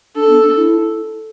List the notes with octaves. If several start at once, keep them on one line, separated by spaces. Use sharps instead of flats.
D4 A4
B3
D4
E4